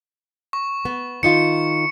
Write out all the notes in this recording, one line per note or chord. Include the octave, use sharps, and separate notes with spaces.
C#6
B3
D#3 D#4 F4 C#7